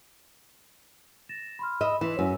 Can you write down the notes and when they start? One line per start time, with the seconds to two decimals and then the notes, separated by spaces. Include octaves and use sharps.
1.29 A6 A#6 E7
1.59 B5 C6 F6
1.81 D#5 E5 B5 D#6
2.01 E3 C6 B6 E7
2.19 F#2 E6